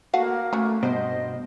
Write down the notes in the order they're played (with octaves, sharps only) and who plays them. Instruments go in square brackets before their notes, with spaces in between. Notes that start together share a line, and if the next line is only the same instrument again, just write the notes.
[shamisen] A3 F5 F#5 [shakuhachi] A#3 [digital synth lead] F#4
[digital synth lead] A3 [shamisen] C#4 F#4
[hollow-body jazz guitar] G2 B2 [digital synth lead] C5 [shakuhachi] D#5